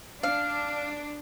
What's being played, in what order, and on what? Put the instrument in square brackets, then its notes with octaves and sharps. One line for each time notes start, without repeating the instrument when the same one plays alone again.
[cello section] D4 [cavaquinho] F5